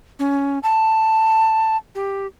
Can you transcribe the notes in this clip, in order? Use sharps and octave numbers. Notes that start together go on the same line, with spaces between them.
C#4
A5
G4